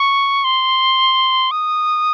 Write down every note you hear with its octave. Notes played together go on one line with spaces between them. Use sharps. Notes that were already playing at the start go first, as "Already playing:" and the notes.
Already playing: C#6
C6
D#6